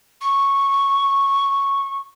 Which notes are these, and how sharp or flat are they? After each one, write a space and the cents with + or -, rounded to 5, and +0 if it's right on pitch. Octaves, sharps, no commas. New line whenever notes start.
C#6 -5